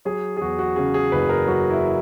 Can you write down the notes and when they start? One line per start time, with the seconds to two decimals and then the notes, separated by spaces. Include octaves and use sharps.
0.05 F#3 G#4
0.37 G#4
0.41 E2 F#4
0.59 F#4
0.76 C#3 G#4
0.94 G#4
1.12 F#1 B4
1.29 A#4
1.47 F#3 F#4
1.70 E4